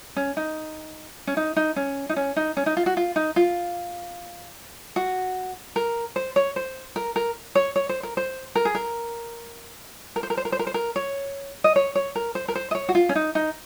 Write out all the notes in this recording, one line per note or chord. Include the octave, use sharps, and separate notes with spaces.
C#4
D#4
C#4
D#4
D#4
C#4
D#4
C#4
D#4
C#4
D#4
F4
F#4
F4
D#4
F4
F#4
A#4
C5
C#5
C5
A#4
A#4
C#5
C#5
C5
A#4
C5
A#4
G#4
A#4
A#4
C5
A#4
C5
A#4
C5
A#4
C5
A#4
C#5
D#5
C#5
C#5
A#4
C5
A#4
C5
D#5
C#5
F#4
F4
C#4
D#4
D#4